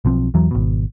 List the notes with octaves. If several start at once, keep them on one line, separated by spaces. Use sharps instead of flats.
B1 F3 C4
E2 E3 F#3
G#1 B2